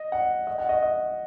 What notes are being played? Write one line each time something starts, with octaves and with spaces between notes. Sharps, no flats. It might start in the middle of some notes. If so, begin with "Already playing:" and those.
Already playing: D#5
F#5
D#5
F#5
D#5
D#5